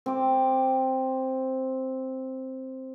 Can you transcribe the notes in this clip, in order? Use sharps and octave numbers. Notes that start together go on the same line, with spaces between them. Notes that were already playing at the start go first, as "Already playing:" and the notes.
C4 D6